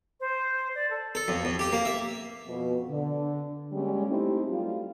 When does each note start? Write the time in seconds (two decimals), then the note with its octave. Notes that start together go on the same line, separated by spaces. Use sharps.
0.20 C5
0.75 D5
0.90 A4
1.15 A4
1.28 F2
1.45 F2
1.59 G4
1.72 A#3
1.85 E5
2.47 F2 B2
2.90 D3
3.72 G3 G#3 A#3 C#4 G4 C#5
4.09 A3 C4 D#4 E4 G4
4.49 F#3 G3 A3 F4